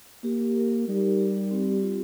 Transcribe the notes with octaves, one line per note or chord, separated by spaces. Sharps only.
A#3 G4
A#4
G3 D#4
G4
C4
F4